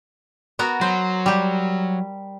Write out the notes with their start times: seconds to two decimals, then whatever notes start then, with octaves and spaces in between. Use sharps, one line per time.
0.59 B3 F#4 A#4
0.81 F#3 C5
1.26 G3 G4